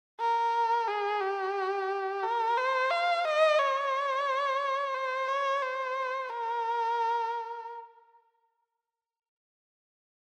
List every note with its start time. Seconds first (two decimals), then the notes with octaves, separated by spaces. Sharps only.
0.20 A#4
0.88 G#4
1.21 G4
2.23 A#4
2.57 C5
2.91 F5
3.25 D#5
3.59 C#5
4.94 C5
5.28 C#5
5.63 C5
6.29 A#4